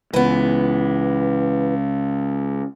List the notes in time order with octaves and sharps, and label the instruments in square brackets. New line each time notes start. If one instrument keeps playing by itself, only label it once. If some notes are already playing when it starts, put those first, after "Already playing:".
[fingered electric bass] C#2 [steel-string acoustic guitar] E3 B3